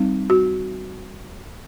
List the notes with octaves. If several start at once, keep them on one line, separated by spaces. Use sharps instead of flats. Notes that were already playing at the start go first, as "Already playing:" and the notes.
Already playing: G3 C4 D#4
F#4